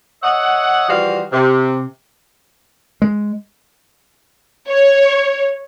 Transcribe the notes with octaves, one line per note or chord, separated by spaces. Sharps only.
C#5 D#5 E5 F#5
E3 F3 G3 F#4 F5
C3
G#3
C#5